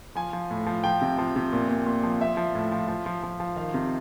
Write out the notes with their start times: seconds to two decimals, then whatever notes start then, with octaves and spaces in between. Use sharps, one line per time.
0.15 F3 G#5
0.33 F3
0.51 A2
0.67 F3
0.84 F3 G5
1.02 C3
1.18 F3
1.36 C3
1.53 A#2
1.69 A#2
1.86 A#2
2.03 F3
2.21 F3 E5
2.37 F3
2.55 A2
2.72 F3
2.88 F3
3.06 F3
3.23 F3
3.40 F3
3.56 D#3 F5
3.74 C3